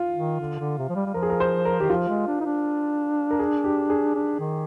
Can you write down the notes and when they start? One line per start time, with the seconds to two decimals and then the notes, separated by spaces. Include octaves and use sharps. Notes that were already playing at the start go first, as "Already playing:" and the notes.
Already playing: F4
0.15 D#3
0.40 D3
0.59 D3
0.78 C3
0.89 F3
0.95 G3
1.06 G3
1.14 F3 A#4
1.23 G#4
1.30 A#4
1.40 C5
1.65 A#4
1.80 D#3 G4
1.90 F3 F4
2.08 G#3
2.27 D4
2.41 D#4
2.45 D4
3.31 A#4
3.39 G#4
3.64 G4
3.90 G#4
4.15 D4
4.40 D#3